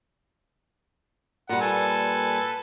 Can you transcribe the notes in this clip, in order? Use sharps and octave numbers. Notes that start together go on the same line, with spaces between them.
A#2 G3 F#5
A4 B4 G#5